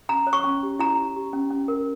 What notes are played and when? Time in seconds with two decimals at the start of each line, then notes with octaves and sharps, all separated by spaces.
0.09 C#4 A#5
0.27 C#5
0.33 C#6
0.44 C#4
0.63 G4
0.79 E4 A#5
0.97 E4
1.16 G4
1.33 C#4
1.51 C#4
1.68 A#4